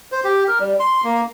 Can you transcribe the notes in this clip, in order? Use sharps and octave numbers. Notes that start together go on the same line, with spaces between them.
C5
G4
A#4
G3
C6
A#3